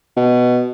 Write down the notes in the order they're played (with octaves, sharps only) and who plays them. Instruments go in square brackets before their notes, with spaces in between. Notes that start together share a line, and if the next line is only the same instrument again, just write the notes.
[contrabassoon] B2